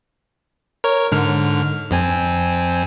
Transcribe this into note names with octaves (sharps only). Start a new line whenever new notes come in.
A#4 C#5
G#2 D3 F6
F2 C4 G#5